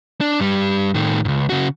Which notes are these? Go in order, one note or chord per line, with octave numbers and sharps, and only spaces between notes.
D4
G2 G3
A2 D#3
C#2 G#2
C#3 F#4